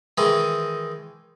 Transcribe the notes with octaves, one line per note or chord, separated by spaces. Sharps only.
D#3 E3 G#3 D#4